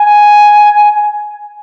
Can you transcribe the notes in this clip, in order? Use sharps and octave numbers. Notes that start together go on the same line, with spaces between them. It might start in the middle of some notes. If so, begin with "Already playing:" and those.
Already playing: G#5